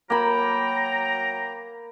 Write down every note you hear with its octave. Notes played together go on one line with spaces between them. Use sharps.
F#3 A#3 G5 A#5 B5